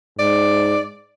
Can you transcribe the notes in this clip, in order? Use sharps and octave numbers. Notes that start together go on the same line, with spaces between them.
G#2 D5